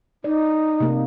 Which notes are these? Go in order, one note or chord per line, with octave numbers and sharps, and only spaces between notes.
D#4 D5
C3 A#3